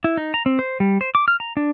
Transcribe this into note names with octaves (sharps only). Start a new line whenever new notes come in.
E4
D#4
A#5
C4
C5
G3
C5
D6
F6
A#5
D4